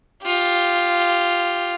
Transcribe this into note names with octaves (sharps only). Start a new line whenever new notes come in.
F4 G4